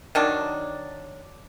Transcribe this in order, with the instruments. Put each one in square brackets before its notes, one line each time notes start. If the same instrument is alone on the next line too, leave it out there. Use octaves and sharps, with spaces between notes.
[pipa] D#3 F#3 D4